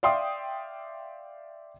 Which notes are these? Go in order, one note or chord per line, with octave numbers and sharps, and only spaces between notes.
D5 E5 F5 G5 C6 D#6